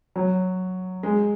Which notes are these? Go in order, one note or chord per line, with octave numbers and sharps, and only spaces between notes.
F#3
G#3